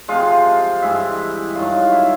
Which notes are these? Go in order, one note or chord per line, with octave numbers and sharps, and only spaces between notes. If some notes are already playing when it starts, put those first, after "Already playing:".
C3 F3 G#3 F4 F5
G2 E3 G#3 E4 E5
G2 D#3 F#3 F4 F5
E4 E5